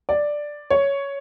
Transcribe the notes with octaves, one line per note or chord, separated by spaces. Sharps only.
D5
C#5